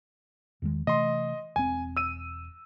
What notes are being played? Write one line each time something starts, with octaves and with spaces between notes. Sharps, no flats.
E2 D#3 G#3
C3 E3 A3 D#5 C6
E1 C4 G#5
E6 D#7